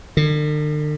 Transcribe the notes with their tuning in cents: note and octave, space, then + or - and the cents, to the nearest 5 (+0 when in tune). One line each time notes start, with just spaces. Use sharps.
D3 +45